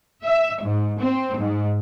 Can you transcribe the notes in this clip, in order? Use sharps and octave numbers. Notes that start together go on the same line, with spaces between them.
E5
G#2
C4
G#2